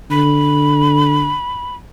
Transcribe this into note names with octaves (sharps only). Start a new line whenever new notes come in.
D3 B5